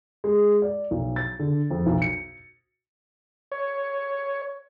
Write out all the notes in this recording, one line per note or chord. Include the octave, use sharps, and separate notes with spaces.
G#3
D5
B1
A6
D3
F2
B1
C#7
C#5